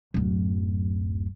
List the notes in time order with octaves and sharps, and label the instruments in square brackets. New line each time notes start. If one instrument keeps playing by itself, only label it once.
[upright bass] D1 F#2